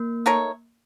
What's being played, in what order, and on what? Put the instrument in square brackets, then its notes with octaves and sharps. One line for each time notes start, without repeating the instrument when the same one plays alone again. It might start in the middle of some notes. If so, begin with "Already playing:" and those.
Already playing: [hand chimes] A#3
[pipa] A3 D#4 A#4 C#5